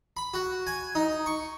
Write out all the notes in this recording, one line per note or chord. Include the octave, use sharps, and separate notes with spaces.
B5
F#4
G#5
D#4
C#6